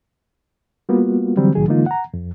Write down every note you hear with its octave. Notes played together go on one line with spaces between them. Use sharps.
G3 A#3 B3 F4 F#4
D3 E3 F#3 G3 C4
C2 A2 D#3 F#3 G#4
D3 E3 G#3 A#3 D#4 F4
F#5 A#5
F2